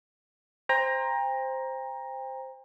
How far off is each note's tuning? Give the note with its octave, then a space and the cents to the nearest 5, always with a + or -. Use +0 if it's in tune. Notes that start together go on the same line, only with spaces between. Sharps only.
C5 +0 G5 +35 A#5 +10